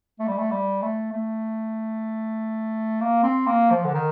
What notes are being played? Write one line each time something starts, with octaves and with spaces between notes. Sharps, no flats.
A3
G3
A3
G3
A3
A3
A#3
C4
A#3
F3
D3
D#3